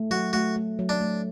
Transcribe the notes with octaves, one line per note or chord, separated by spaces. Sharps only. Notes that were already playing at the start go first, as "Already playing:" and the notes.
Already playing: A3
F#3 F#4
A3 F#4
A3
F#3
D4
A3